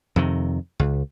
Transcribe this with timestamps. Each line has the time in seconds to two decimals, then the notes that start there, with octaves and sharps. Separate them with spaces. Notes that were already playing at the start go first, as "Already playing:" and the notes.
0.16 F2 C3 D#3
0.79 C#2